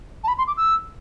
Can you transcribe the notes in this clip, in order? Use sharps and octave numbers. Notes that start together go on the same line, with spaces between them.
A5
B5
C6
D6
E6